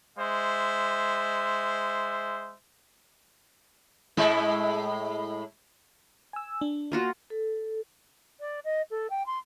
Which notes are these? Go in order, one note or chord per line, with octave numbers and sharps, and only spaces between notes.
G#3 C5 E5
A2 G#3 E4
G#5 E6
D4
A#3 F4 F#4
A4
D5
D#5
A4
G5
C6